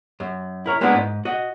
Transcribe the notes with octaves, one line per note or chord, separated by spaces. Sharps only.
F#2
E4 A#4 C#5
G#3 A#3 B3 C#4 D4 E4
G#2
F#4 D#5